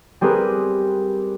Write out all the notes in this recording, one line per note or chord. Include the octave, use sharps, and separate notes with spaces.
G3 C4 G4 G#4 A#4 B4